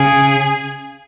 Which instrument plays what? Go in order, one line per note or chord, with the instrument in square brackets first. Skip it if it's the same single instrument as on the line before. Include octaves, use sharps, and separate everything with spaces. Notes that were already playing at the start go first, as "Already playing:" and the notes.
Already playing: [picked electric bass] C#3 [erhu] G#4